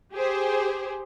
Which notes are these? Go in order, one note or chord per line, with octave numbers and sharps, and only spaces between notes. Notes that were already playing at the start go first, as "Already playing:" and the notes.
G4 G#4 C5